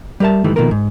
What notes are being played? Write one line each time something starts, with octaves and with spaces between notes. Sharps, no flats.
G3 G4 A#4 E5 A5
G#2 D#3 E3 G3 A3
B2 D#3 F3 A3 A#3 A#4
G#2